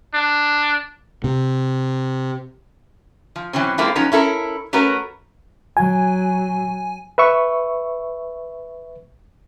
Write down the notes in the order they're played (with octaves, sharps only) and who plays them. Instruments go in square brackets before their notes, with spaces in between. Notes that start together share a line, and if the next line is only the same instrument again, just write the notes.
[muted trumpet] D4
[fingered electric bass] C3
[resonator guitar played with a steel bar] F3
B2 E3 F#3 C4 C#4
G#3 A#3 C4 E4 F4 A4
F3 F#3 B3 C#4 D#4
C#4 E4 A4 A#4
A3 C#4 F#4 A#4 B4
[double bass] F#3 [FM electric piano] G#5
[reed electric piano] B4 E5 C#6